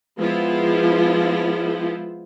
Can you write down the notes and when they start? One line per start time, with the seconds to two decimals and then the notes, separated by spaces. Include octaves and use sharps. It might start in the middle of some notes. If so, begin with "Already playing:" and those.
0.17 F3 G#3 B3 E4 F4